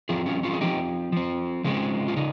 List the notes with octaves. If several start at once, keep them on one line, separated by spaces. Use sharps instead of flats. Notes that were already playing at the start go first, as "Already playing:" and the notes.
F3 C4 F4 G#4
C#4 F4
C#4 F4
G#4
F3 C4 D#4 G4
F3 C4
C#3 F3 G#3 C4
F4
C#3 D#4